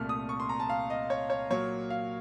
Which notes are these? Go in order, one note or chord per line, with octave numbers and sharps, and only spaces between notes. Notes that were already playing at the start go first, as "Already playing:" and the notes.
Already playing: C2 A#2 A3 F6
D#6
C#6
C6
A#5
A5
F5
D#5
C#5
C#5
A#2 F#3 A#3 C#5
F5